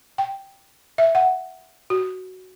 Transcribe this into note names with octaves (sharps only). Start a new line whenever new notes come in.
G5
E5
F#5
F#4